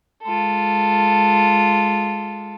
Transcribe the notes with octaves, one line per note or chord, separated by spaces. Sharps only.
G#3 F4 A4